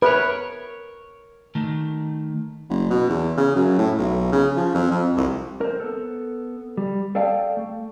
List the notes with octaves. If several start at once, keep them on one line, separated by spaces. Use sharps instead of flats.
A#4 B4 C#5
D#3 A3
F#1
B2
E2
C#3
F#2
A2
B1
C#3
F3
F2
F2
C2
A#4 C5
B3 A4
G3
G#4 A4 D5 F5 G5 A5
A3